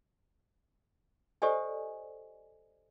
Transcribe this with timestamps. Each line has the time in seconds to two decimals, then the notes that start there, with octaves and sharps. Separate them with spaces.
1.42 G4 A4 C5 D5 D#5 G#5